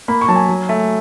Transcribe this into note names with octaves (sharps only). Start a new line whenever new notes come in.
A#3 B5
C#6
F#3 A5
G#5
F#3
A3